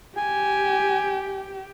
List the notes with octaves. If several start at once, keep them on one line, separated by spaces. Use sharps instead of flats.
G4 G#5